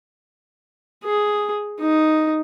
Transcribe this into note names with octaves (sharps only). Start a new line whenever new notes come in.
G#4
D#4